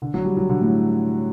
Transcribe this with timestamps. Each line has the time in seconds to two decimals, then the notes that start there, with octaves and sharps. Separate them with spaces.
0.02 D3
0.14 F#3
0.25 G3
0.37 F#3
0.49 D3
0.61 A2